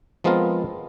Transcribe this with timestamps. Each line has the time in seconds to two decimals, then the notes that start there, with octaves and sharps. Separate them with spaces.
0.24 F3 G#3 B3 C4 F4 A#4